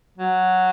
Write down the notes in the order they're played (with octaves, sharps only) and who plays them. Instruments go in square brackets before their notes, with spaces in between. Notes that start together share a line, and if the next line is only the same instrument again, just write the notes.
[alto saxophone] F#3